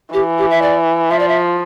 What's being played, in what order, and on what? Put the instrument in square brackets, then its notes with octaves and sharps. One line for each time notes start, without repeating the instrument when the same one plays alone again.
[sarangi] E3 [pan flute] G4
[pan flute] G4
E5
D5
[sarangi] F3 [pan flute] E5
[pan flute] D5
E5